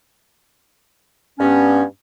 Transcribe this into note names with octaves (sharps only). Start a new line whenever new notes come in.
G2 B3 C#4